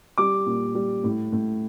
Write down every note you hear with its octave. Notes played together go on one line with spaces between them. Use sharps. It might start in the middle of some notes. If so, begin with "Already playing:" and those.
G3 D6
A#2
G3
A2
A2